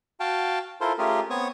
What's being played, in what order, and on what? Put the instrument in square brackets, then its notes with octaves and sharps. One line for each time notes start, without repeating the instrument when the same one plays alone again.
[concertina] F#4 F5 G5 A5
E4 F4 A4 A#4 C5
A3 C#4 F4 G4 G#4 A#4
B3 C4 C#5 C#6 D#6